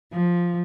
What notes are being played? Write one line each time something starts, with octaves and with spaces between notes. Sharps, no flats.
F3